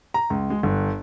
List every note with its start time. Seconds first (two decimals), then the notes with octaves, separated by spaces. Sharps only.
0.14 A#5
0.30 C#2
0.50 G#3
0.63 G1